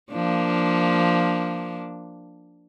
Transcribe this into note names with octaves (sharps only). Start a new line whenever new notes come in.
F3 A#3 D4